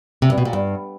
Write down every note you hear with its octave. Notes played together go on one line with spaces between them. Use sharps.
C3
G2
B2
A#2
G2